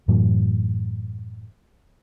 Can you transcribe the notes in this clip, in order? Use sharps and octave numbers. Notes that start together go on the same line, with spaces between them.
F#2 A2 E3 F#3